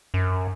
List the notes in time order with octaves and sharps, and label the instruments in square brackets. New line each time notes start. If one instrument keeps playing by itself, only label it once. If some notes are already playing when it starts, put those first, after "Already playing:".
[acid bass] F#2